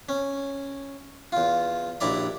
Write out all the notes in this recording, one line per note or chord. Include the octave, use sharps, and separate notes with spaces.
C#4
E2 F4
A#1 D#2 E4 D5 A#5